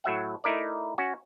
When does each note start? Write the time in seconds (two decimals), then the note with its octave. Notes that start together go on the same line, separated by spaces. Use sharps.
0.04 A2 F#3 E5 F#5
0.44 A3 D#4 E4 A#4 D5
0.98 C#4 F#4